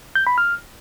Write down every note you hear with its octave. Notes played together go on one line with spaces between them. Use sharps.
G6
B5
F6